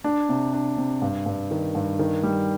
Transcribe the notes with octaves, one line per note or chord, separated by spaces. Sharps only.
D4
C3
D4
C3
G2
G2
D#3
G2
D#3
G3